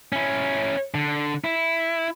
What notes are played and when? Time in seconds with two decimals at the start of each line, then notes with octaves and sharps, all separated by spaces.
0.13 C#4 E4
0.95 D3
1.44 E4